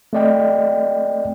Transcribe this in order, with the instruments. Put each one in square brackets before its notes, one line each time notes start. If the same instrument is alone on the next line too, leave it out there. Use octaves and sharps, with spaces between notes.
[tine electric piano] A3 C4 D5 D#5 G5